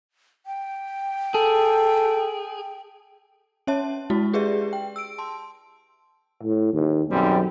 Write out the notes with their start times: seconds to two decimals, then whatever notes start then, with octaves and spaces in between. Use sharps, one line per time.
0.46 G5
1.34 G#4 A4
3.67 C#4 C#5 E5 A5
4.10 G#3 E4 F#4
4.33 G4 G#4 B4 D5 E5
4.73 G5
4.96 E6 D7
5.18 A5 C6
6.43 A2
6.73 D#2
7.10 B1 F#2 G3 C4